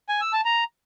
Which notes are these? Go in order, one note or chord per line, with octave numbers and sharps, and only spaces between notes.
G#5
E6
A5
A#5